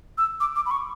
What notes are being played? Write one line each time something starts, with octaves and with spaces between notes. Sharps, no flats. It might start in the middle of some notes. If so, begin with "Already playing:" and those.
E6
D6
D6
B5
C#6